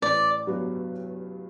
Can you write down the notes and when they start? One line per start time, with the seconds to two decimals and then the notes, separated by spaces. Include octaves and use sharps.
0.02 A1 D5
0.47 G2 F#3 B3 F#4